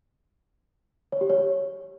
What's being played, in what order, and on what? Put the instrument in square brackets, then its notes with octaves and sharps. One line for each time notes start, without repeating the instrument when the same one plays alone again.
[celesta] C#5
G4
C#5